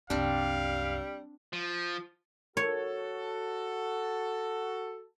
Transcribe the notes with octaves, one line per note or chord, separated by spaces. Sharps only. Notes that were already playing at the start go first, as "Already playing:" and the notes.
C2 F#2 G3 C4 D4 F5
F3
F#4 A4 C#5